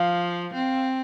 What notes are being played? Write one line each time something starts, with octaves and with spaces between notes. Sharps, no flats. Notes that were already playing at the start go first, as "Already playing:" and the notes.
Already playing: F3 F5
C4